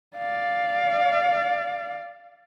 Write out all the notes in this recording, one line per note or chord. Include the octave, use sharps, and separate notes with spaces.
D5 F5